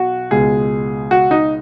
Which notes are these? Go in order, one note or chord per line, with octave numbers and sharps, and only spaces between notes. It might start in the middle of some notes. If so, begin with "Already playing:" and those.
Already playing: B1 F#4
C#2 B2 G#3 G#4
F#4
D#4